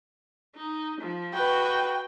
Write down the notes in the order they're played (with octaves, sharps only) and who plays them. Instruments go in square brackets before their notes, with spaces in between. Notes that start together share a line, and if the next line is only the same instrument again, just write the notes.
[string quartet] D#4
F3
[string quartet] F#4 B4 [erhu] G5